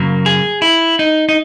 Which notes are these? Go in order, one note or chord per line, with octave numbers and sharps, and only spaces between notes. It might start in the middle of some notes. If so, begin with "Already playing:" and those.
Already playing: F#2 C#3 F#3 A#3
G#4
E4
D#4
D#4